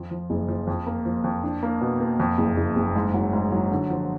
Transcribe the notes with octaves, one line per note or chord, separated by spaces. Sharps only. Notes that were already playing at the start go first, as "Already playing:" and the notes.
Already playing: F2
F3
F#1
F3
F2
A#3
F3
F2
D4
A#3
B2
A#3
F2
F#1
F#1
F#1
G#2
F#3
G#2
F#3
D3
F3